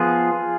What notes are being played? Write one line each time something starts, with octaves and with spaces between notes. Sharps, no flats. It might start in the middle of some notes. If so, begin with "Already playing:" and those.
Already playing: F3 B3 F4 G#4